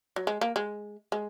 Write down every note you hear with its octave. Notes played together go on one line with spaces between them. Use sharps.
F#3
G#3
A#3
G#3
G#3